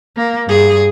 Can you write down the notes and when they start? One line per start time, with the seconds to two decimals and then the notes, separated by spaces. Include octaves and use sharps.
0.17 A#3
0.47 G2 G#4